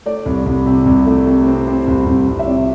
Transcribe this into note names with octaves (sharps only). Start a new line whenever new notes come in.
A3 D5
C2
C2
C3
C2
A3
C3
C4
C4
C2
C2
C2
E5
C3 D5